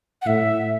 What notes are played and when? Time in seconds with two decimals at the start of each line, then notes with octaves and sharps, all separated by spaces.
0.22 F#5
0.27 A2 E5